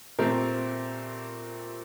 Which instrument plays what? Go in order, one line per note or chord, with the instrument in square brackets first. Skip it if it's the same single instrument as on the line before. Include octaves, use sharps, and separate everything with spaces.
[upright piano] A#2 A3 C4 G4 A#4